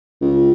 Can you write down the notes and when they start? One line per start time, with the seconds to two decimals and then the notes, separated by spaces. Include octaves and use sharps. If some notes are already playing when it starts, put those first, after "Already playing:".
0.21 C#2